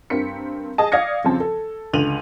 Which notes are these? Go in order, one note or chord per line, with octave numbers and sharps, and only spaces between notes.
G2 C4 A#4 B6 C#7
G#4 D#5 A5
D5 F5 D#6 G#6 A#6 C#7
F2 C#3 F3 C4 A5
A4
C#2 D3 D#7 F7 F#7